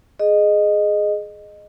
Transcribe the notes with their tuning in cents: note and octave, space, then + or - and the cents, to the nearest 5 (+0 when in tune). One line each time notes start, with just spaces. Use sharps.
G#4 +10 D#5 -15